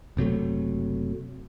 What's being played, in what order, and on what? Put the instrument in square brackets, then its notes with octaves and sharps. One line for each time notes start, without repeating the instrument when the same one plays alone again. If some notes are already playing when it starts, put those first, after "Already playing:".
[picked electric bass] F#1 C3 F#3 A3